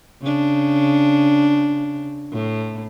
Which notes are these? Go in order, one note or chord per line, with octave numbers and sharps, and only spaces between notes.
C#3 D4
A2